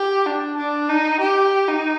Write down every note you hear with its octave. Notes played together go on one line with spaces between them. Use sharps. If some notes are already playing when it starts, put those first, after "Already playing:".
Already playing: G4
D4
D4
D#4
G4
D#4